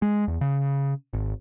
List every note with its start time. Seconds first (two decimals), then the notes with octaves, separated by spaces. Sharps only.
0.02 G#3
0.28 E2
0.41 C#3
1.13 G#1